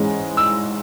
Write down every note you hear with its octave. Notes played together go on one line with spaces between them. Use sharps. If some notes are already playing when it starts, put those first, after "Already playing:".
Already playing: G#2 E3 G#3 C#4
E6